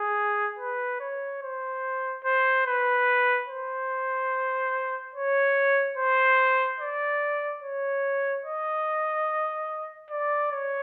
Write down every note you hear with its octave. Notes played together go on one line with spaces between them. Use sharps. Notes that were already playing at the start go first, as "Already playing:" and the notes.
Already playing: G#4
B4
C#5
C5
C5
B4
C5
C#5
C5
D5
C#5
D#5
D5
C#5